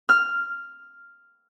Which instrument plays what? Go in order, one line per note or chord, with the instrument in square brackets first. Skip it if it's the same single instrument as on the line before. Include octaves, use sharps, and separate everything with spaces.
[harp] F6